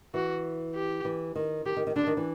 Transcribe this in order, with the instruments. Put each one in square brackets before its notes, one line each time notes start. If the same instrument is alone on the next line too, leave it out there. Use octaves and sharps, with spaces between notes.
[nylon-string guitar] E3 [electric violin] F#4
[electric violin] G4
[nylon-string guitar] E3
D#3
[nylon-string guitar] D#3 [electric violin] G4
[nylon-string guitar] D#3
D#3
[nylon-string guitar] D3 [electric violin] D4
[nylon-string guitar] D#3
E3